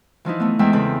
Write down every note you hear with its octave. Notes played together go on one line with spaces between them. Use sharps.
E3 F3 D#4 E4
A3 B3
E2 E3 G#3 B3 E5 G5
E2 C#3 C4 A4 B5